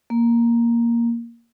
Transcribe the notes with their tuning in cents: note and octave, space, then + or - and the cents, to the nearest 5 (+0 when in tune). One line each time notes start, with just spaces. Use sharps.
A#3 +5